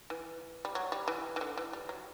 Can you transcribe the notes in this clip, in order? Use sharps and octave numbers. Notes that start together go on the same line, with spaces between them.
E3
G3
F#3
G3
E3
E3
D3
E3
G3
F#3